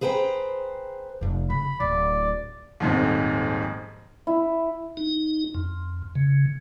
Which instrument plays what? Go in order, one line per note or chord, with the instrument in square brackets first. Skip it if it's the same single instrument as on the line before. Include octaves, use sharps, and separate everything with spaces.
[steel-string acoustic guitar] G#4 B4 C5 G5 A#5
[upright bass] F1 D#4
[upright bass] C#3 [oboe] B5
[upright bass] D1 [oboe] D5
[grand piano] D#1 F2 G#2
[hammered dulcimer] E4
[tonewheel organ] D#4
F2
C#3